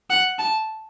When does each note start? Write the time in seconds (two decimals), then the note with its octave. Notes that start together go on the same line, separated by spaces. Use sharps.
0.10 F#5
0.39 A5